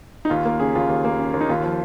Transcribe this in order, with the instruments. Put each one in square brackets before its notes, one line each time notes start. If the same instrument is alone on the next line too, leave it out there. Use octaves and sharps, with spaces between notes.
[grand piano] D#4
D#2 F4
A#3
C#3 G#4
D#2 F4
D#2
A#3
C#3
D#2
D#4
D#2 F4
F3